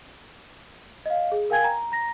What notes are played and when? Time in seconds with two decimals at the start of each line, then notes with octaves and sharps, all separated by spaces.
1.06 D#5 F5
1.32 G#4
1.50 A#4 F5 G5 G#5 G#6
1.64 A#5
1.92 A#5 A#6